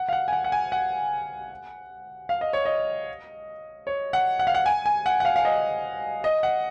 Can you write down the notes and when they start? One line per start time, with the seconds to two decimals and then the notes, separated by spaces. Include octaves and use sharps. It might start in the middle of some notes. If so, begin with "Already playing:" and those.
Already playing: F#5
0.09 F5
0.13 F#5
0.28 G#5
0.33 F#5
0.44 F#5
0.52 G#5
0.72 F#5
2.29 F5
2.41 D#5
2.53 C#5
2.65 D#5
3.87 C#5
4.13 F#5
4.39 F#5
4.47 F5
4.55 F#5
4.66 G#5
4.86 G#5
5.06 F#5
5.20 F#5
5.25 F5
5.36 F5
5.45 D#5
6.24 D#5
6.43 F#5